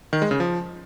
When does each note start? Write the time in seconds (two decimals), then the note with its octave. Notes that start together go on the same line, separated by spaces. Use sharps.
0.13 D#3
0.22 G#3
0.31 C#3
0.40 F3